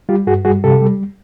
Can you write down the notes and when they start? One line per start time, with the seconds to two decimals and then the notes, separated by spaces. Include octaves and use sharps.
0.09 G3 F4 G4
0.27 G2 F#4 G#4
0.45 G3 F#4 G#4
0.64 C3 G4 A4
0.82 G3